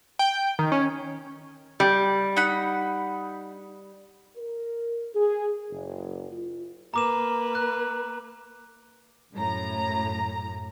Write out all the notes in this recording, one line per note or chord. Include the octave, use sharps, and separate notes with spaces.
G5
D#3
C#4
G3
D#4 F#5 B5
A#4
G#4
F#1
F4
A#3 B4 A#5 D6 E7
F#6
F#2 A2 A#5